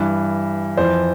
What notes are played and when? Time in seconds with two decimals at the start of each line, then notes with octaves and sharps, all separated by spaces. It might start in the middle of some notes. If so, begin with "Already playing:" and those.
Already playing: G2 E3
0.77 F2 E3 C5